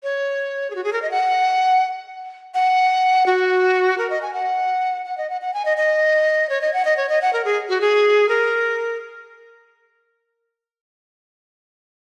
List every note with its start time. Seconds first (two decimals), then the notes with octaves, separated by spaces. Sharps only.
0.03 C#5
0.70 G#4
0.75 F#4
0.84 G#4
0.93 A#4
1.02 D#5
1.11 F#5
2.54 F#5
3.26 F#4
3.98 A#4
4.10 D#5
4.22 G#5
4.34 F#5
5.06 F#5
5.18 D#5
5.30 F#5
5.42 F#5
5.54 G#5
5.65 D#5
5.77 D#5
6.49 C#5
6.61 D#5
6.73 F#5
6.85 D#5
6.97 C#5
7.09 D#5
7.22 F#5
7.33 A#4
7.45 G#4
7.69 F#4
7.81 G#4
8.29 A#4